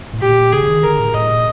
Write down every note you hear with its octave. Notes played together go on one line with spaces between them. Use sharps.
A2
A#2 G4
C#3 G#4
D3
D#3
D3 A#4
A2
A2 D#5
A#2